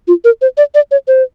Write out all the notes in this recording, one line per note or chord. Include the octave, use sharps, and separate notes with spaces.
F4
A#4
C5
D5
D5
C#5
C5